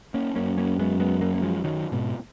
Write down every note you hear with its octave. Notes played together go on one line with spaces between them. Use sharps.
A#3 C#4
F#2 A#3 C#4
A#3 C#4
G#3 B3
G#3 B3
F#3 A#3
A#3
F3 G#3
D#3 F#3
G#2 B2